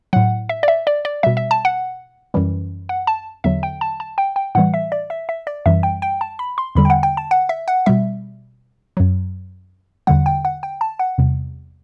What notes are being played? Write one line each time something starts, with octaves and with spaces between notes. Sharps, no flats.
A2 F#3 F#5
E5
D5
E5
D5
D5
B2 G3 E5
E5
A5
F#5
F#2 E3 G3
F#5
A5
E2 D3 F#3 E5
G5
A5
A5
G5
G5
A2 E3 G3 F#5
E5
D5
E5
E5
D5
F#2 E3 G3 E5
G5
G5
A5
B5
C6
E2 D3 G3 B5
G5
F#5
G5
A5
F#5
E5
F#5
B2 G3 E5
F#2 F#3
E2 D3 G3 F#5
G5
F#5
G5
A5
F#5
E2 C3 G3